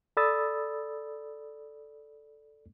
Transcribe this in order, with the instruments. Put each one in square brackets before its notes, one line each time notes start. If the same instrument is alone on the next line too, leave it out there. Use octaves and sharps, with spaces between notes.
[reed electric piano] A4 D5 B5 D#6 E6 A6